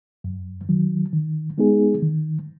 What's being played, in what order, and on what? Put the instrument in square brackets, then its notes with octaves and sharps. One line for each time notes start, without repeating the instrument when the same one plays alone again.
[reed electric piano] F#2
D#3 F#3
D#3
G#3 B3 D#4 G#4
D#3